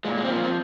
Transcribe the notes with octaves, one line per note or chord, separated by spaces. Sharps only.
A#2 G#3
G#3
C4
F3 A#3
C4